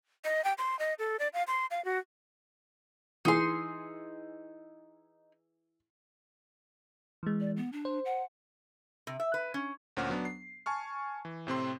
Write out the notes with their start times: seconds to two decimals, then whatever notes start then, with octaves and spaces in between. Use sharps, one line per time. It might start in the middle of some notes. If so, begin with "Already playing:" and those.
0.25 D#5
0.44 G5
0.58 C6
0.79 D#5
0.99 A4
1.19 D5
1.33 F5
1.47 C6
1.71 F5
1.85 F#4
3.25 E3 D#4 G#4 C6
7.23 E3 G#3
7.40 D5
7.57 B3
7.73 D4
7.85 C5
8.06 F#5
9.07 C3
9.20 E5
9.34 B4
9.54 C#4
9.97 D2 A#2 C#4 C5 F#5 F6
10.09 F#3 B3 D4
10.25 C7
10.66 G#5 A5 C#6 F6
11.25 E3
11.47 A2 C3 C4 C6